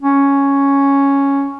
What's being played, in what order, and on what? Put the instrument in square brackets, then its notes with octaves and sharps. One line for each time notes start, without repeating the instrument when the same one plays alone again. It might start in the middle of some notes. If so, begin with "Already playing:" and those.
[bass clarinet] C#4